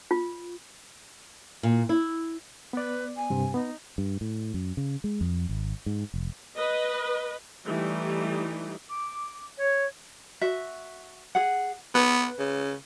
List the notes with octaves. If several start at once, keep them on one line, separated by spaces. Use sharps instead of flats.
F4
A#2
E4
B3 B4 D5
G#5
G2 C3 C4
B3 D#4
G2
A2
F#2
C#3
G#3
F2
G#1
G#2
F1
B4 D#5
E3 G3 A3 D#4
D6
C#5
F#4 E5
G#4 F#5
B3 B4
C#3